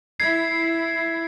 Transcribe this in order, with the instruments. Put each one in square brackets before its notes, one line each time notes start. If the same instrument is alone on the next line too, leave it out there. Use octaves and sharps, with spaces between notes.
[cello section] E4 [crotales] G#6 C7